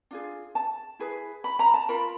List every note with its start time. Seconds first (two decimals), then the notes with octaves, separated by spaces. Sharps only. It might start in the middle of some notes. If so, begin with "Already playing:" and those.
0.11 D4 F4 G#4
0.55 A5
0.99 E4 G#4 B4
1.44 B5
1.59 A#5
1.74 A5
1.89 F4 A#4 B5